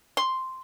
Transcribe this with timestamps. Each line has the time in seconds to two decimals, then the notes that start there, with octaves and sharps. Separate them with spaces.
0.17 C6